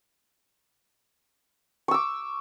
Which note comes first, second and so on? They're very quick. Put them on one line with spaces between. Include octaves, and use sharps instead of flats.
C#6 E6 D6